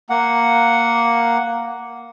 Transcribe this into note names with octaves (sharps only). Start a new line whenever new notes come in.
A#3 F#5